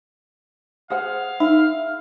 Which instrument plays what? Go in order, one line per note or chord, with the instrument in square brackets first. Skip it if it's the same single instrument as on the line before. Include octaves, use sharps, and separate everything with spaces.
[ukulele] G#4 C5 F#5 [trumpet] F5
[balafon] D#4 [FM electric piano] E5